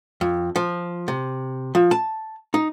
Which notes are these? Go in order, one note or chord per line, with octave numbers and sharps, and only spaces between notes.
F2
F3
C3
F3
A5
D#4